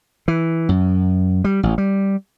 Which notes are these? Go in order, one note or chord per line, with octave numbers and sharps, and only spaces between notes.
E3
F#2
G3
A1
G3